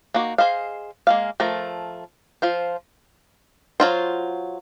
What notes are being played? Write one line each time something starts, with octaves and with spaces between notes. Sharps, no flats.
A#3 D#4 F#4
G#4 C5 D#5 F5
G#3 A#3 F5
F3 A3 A#4 A#5
F3 F4 C5
F#3 F4 C5